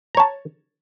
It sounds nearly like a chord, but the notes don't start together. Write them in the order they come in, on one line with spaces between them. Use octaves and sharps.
A#5 C#5 A5